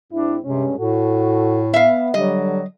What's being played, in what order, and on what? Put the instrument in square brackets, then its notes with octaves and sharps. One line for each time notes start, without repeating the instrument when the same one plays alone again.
[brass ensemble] G#2 C4 E4 [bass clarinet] D4
[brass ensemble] G2 G#3 C#4 [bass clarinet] C3
[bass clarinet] A2 [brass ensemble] F#4 A4
[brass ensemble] B3 [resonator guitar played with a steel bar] E5 F5
[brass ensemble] D3 G3 [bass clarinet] F#3 [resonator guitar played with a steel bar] D#5